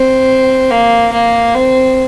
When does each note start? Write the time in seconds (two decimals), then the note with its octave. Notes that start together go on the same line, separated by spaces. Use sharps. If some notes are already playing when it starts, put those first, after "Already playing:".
Already playing: C4
0.71 A#3
1.13 A#3
1.55 C4